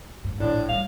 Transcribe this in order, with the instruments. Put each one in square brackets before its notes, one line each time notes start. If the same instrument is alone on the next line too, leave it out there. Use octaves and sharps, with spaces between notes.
[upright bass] G#2
[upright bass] A#1 E2 [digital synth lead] A2 [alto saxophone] D4
[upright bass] G3 [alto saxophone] F5